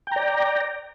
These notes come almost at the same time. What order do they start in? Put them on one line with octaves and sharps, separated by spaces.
G5 A#5 D5